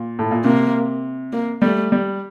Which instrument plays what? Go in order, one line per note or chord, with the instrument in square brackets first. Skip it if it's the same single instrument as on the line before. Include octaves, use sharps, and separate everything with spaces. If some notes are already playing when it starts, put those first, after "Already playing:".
Already playing: [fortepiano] A#2
A2
A#2
[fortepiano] C3 [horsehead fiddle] A#3
[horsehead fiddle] A#3
[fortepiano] G3 [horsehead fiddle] A3
[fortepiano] G3